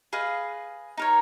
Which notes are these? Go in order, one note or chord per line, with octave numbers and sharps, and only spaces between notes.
G#4 B4 D#5 F5
D#4 A#4 C#5